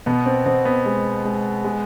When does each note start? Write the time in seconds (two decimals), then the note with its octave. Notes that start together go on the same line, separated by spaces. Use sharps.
0.06 B2 B3
0.26 C4
0.46 B2 C4
0.65 B3
0.86 G#3
1.25 G#3
1.64 G#3